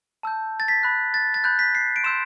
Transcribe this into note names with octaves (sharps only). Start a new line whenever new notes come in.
A5 E6 G6
A6
B6
B5 F#6
A6
A6
B5 F#6 G6
B6
C7
D7
C6 E6 G6 E7